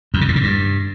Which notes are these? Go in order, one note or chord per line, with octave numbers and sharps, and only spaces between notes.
F2
C#3
A2
C#3
G2